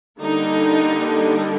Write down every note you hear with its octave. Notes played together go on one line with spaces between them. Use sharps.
D3 G3 A#3 D4 D#4